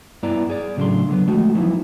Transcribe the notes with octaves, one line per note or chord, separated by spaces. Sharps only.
G2 B3 E4 D5 A#5
G#4 D5
A2 C#3 F#3 A3 D4 C6
D3 F#3 B3
F3 G#3 A3 F#4
F3 F#3 B3 D#4 E4